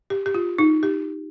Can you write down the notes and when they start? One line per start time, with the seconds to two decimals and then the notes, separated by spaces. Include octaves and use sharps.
0.10 G4
0.26 G4
0.35 F4
0.59 D#4
0.83 G4